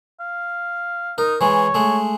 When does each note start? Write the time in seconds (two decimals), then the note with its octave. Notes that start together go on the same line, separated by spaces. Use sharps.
0.20 F5
1.18 D#4 A#4
1.41 E3 G#3 C#5
1.74 G#3 A3